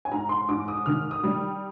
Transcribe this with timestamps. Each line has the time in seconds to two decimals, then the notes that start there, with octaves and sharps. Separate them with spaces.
0.05 G#5
0.11 G#2 A#5
0.29 C6
0.49 G#2 D6
0.68 D#6
0.86 D#3 F6
1.11 D#6
1.23 G3